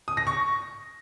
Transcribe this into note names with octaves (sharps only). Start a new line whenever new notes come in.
D#6
A#6
C#6